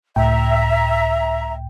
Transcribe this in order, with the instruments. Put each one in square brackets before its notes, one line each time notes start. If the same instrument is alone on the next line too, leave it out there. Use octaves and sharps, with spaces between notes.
[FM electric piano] C#2 A2 G5 [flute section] E5 A#5